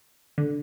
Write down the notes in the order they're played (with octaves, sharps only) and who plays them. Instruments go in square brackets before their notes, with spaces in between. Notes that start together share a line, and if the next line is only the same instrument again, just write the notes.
[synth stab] D3